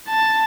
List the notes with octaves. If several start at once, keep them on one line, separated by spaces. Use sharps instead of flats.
A5